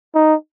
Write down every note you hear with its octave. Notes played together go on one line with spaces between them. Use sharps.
D#4